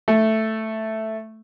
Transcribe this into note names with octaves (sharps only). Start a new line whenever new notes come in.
A3